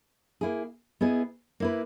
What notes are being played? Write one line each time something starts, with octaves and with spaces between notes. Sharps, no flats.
A#3 E4 G#4
B3 E4 G#4 D#5
A#3 E4 B4